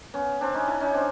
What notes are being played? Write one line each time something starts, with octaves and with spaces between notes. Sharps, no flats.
B3 C#4
C4 D4
C#4 D#4
D4 E4
C#4 D#4
C4 D4